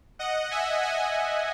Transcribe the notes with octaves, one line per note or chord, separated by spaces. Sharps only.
D#5 F#5
E5 G#5
E5 G#5